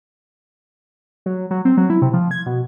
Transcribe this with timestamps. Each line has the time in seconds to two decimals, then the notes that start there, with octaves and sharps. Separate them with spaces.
1.26 F#3
1.51 F#3
1.65 C4
1.77 F#3
1.90 E4
2.02 C3
2.13 F3
2.31 G#6
2.46 B2